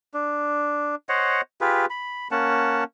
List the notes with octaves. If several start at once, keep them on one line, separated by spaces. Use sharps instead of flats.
D4
C5 C#5 D#5 F#5
F4 G4 G#4 B4
B5
A#3 C#4 F#5 A5